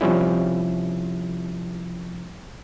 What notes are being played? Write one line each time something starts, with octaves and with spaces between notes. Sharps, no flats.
C3 F3 G3 C#4 E4